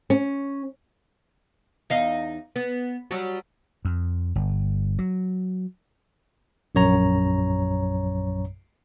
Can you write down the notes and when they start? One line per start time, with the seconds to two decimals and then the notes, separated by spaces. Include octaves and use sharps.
0.10 C#4
1.90 E2 D#4 F5
2.56 B3
3.11 F#3 G3 F#4
3.85 F2
4.35 G1
4.99 F#3
6.75 A#1 F#2 C#5 A#5